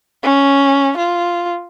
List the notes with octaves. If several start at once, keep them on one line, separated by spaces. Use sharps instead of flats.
C#4
F4